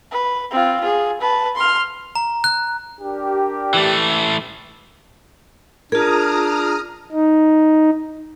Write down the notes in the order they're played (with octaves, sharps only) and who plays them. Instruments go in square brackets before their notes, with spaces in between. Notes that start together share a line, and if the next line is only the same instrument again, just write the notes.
[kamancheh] B4
C4 F4
F4 G#4
B4 A5
C6 F6
[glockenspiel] A#5
F#6
[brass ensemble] D4 G4 A#4
[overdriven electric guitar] E3 A3
[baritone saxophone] D4 [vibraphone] F4 G#4 [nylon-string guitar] A#4 [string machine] A#5 D#6 F6
[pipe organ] D#4